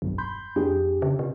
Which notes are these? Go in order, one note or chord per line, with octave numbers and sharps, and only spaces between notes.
E1 B1 G2
B5 C6 G6
F2 D4 G4 G#4
C#3
C3